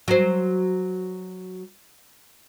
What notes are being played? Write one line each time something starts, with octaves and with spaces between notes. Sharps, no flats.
F#3 C5